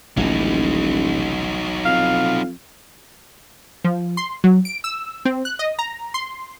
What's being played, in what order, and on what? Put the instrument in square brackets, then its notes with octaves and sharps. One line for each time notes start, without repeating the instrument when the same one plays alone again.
[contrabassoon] D#1 [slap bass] A1 D2 [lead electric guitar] F#3 D#4
[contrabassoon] F2 [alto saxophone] F5
[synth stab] F3
C6
F#3
D7
E6
C4
F#6
D#5
A#5
C6